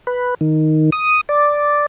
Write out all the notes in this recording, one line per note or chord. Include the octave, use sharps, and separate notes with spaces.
B4
D#3
D#6
D5